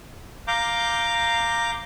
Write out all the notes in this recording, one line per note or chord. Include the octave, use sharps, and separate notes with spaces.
F5 A#5 D6 G6